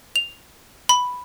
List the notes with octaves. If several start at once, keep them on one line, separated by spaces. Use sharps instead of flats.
F7
B5